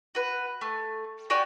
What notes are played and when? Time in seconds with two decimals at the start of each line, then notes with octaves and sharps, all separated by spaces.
0.15 F#4 B4
0.61 A3
1.30 F#4 G4 D5 G#5